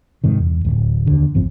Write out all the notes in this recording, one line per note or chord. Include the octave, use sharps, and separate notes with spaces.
G#2 C3 D#3
E2
D1
D#2 D3
A1 G2 F3 C4